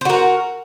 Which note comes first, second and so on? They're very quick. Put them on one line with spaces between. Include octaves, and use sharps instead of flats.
C5 F#4 A#4